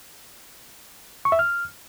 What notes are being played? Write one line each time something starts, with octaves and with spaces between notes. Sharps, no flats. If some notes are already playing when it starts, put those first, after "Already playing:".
C#6
E5
F6